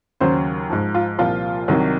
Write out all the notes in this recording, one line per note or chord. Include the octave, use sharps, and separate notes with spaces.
D#2 C#3 F#3 C5
G#2 F3
F4
C2 A#2 F3 F4
C2 C3 D#3 F#3